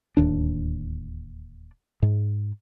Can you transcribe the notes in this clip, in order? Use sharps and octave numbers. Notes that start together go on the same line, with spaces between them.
D1 D#2 D4
G#2